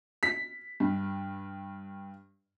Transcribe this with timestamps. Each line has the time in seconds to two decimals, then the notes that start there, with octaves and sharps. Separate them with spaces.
0.23 B6
0.80 G2